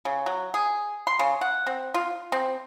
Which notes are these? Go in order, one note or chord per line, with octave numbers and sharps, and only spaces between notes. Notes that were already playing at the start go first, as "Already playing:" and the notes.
C#3
F#3
G#4
C6
C#3
F#5
C4
F4
C4